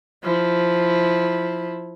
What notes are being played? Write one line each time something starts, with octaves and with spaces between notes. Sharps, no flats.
F3 E4